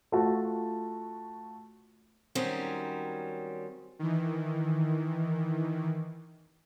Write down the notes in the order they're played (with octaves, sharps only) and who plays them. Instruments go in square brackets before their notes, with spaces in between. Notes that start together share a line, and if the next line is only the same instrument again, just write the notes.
[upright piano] A3 F4 F#4 A5
[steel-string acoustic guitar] D#3 F#3 G3 C4 C#4
[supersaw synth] D#3 E3